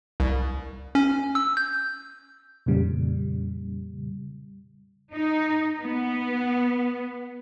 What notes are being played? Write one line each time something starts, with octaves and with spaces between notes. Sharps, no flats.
C2
C#4
E6
G6
F2 A#2 C#3 G3
D#4
B3